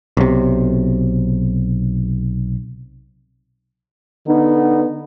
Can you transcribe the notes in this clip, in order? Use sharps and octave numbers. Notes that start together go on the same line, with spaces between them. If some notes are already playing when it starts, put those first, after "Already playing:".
B1 C3
D3 B3 D#4